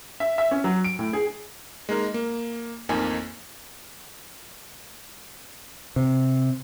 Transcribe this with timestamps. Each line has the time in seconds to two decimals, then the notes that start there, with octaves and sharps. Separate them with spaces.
0.20 E5
0.38 E5
0.51 C#4
0.64 F#3
0.84 D7
0.99 A2
1.13 G#4
1.89 G#3 A#3 D#4 A#4
2.14 A#3
2.89 A1 F2 A#3 D#4 G#5
5.96 C3